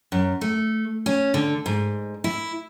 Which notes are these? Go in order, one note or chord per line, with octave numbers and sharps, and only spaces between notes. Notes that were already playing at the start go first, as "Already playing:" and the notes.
F#2
A3
C#4
D3
G#2
E4